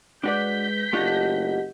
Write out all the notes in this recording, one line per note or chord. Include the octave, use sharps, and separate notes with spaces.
G#3 D4 F#4 B4 D5 G6 B6
F#1 A3 D4 F4 G4 D#5 F#5